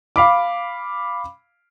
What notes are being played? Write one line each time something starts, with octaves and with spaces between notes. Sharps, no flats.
F5 B5 D6